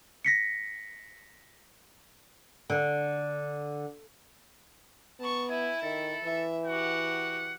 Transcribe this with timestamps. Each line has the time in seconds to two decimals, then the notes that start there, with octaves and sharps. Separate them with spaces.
0.25 A#6 B6 C#7
2.70 D3
5.20 B3 A5 C#6
5.50 E4 E5 G#5
5.82 D#3 A4
6.24 E3 E5
6.66 F#4 G4 F#5